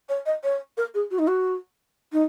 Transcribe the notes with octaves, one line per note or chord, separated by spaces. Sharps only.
C#5
D#5
C#5
A#4
G#4
F#4
D#4
F#4
D#4